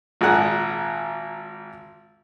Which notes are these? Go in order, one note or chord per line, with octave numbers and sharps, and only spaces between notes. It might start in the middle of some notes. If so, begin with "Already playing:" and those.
G#1 A#2 G#4 F#5